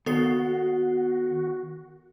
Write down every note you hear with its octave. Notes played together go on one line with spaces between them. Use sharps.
D#2 D#3 B3 F#4 A4 C7